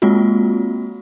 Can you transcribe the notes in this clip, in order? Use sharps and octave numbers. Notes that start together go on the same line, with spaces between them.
G#3 A#3 C4 F4 F#4